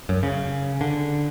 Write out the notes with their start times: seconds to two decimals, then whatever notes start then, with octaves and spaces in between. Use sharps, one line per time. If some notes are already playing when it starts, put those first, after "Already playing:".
0.09 F#2
0.23 C#3
0.81 D3